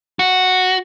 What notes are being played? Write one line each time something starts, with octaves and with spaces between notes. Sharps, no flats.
F#4